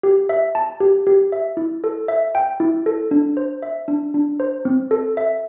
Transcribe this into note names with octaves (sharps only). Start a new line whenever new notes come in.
G4
E5
A5
G4
G4
E5
E4
A4
E5
G5
E4
A4
D4
C5
E5
D4
D4
C5
C4
A4
E5